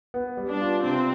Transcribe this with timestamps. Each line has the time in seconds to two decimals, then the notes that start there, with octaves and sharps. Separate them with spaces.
0.14 B3
0.37 G3
0.49 D4
0.61 F4
0.83 C3 C4